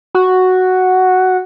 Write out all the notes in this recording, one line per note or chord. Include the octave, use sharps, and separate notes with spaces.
F#4